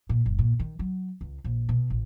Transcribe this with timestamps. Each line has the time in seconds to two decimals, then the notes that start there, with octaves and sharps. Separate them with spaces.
0.09 A#2
0.26 F#1
0.39 A#2
0.59 D#3
0.79 F#3
1.21 C#2
1.44 A#1
1.69 B2
1.90 A1